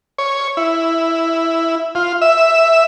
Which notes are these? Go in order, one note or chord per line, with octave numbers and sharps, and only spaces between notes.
C#5
E4
F4
E5